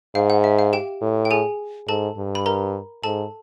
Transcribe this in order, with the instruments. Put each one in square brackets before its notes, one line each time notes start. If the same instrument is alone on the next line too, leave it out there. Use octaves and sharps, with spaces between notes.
[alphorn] G#2 [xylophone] F5
[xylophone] F#5
E5
F5
G4 G5
[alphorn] A2
[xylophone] G5
G#4 G#5
[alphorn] G#2 [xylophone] A4 A5
[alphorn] G2
[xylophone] B5
A#4 A#5
[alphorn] G#2 [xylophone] A4 A5